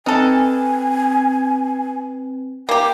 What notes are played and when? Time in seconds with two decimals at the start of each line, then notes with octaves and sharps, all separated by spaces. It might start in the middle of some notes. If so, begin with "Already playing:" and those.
0.06 C4 D#4 A4 B4 G#5
2.69 A#3 G4 G5